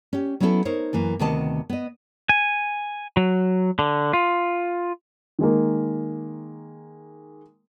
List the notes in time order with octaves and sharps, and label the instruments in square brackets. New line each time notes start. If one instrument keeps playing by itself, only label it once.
[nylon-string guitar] C#4 G4
F#3 B3 C#4 E4 G#4 A4
D#4 A#4 C5 C#5
F#2 E3 A#3
D2 C3 D#3 B3 D#5 A5
B3 D#5
[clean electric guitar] G#5
F#3
D3
F4
[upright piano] D#3 G#3 A#3